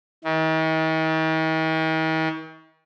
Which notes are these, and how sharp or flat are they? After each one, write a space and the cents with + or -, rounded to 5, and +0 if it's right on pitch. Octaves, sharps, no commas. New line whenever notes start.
D#3 +45